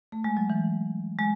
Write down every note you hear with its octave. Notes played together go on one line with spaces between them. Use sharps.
A3
G#3
F#3
E3
G#3